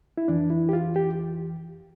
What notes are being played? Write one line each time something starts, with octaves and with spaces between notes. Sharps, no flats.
E4
F2 E3 D4
E4
G4
F4
G4